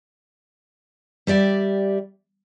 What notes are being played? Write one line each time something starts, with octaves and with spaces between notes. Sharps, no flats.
G3 G4 D5 E5